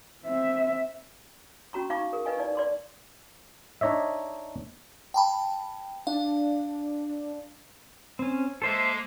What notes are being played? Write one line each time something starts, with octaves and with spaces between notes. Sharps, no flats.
C4 E5
C#4 F#4 A#5 C#6
D#4 F5 A#5 C#6 D6
G#4 A#4
D#4 B4 D#5 F5 G#5 C#6
D#4 E4 D5
D5 C6 D6
D4 D#4 C#5 D#5 E5
G5 A5 B5
D4 F5
C4 C#4
G#3 A#3 A4 C5 E5